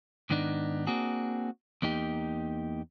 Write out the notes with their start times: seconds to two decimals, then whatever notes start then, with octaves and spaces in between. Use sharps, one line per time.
0.30 G#2 D#3 B3 D4 D#4
0.87 A#3 C4 D4 F#4 G#4
1.82 E2 A#3 D#4 G4